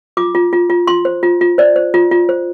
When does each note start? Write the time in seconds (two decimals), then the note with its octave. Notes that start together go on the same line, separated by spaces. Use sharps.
0.17 F4 D6
0.35 F4
0.53 F4
0.70 F4
0.87 F4 C6
1.05 C5
1.23 F4
1.41 F4
1.58 C5 D5
1.76 C5
1.94 F4
2.11 F4
2.29 C5